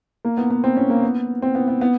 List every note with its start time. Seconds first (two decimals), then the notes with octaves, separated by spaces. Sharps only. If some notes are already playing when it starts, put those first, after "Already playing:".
0.25 A#3
0.38 B3
0.50 B3
0.64 C4
0.77 C#4
0.90 A#3
1.03 B3
1.42 C4
1.55 B3
1.68 B3
1.81 B3